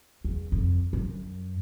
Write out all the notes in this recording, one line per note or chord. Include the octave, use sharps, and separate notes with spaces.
E2
F2
F#2